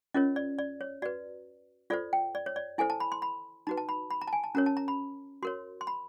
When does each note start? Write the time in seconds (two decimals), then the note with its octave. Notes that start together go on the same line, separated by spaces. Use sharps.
0.14 C#4 F4 A#4 C#5 D#5
0.36 D5
0.59 D5
0.81 C#5
1.02 F#4 B4 D5
1.90 F4 A4 C5 D5
2.13 G5
2.35 D5
2.46 C#5
2.56 D5
2.78 E4 A4 C5 G#5
2.90 A5
3.00 B5
3.12 C6
3.22 B5
3.67 D#4 F#4 B4 A#5
3.77 A5
3.89 B5
4.10 B5
4.22 A#5
4.28 A5
4.33 G#5
4.44 A5
4.55 C#4 F#4 A#4 C#5 A#5
4.66 A5
4.77 A#5
4.88 B5
5.43 F#4 A#4 C#5 C6
5.81 C6
5.87 B5